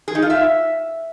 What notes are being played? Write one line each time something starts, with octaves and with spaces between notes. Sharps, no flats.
G#4
D#4
F4
E5